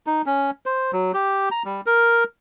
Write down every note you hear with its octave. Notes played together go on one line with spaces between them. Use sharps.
D#4
C#4
C5
F#3
G4
A#5
G3
A#4